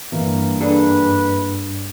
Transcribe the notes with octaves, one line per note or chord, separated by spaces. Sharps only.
G2 E3 A#3
D4 G#4 A4 B4